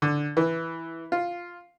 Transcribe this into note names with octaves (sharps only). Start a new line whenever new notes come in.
D3
E3
F4